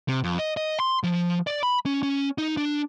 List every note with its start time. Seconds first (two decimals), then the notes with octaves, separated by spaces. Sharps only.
0.09 C3
0.24 F2
0.39 D#5
0.57 D#5
0.80 C6
1.03 F3
1.47 D5
1.63 B5
1.86 C#4
2.03 C#4
2.38 D#4
2.57 D4